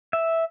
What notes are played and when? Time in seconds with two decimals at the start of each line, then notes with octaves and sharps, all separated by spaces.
0.13 E5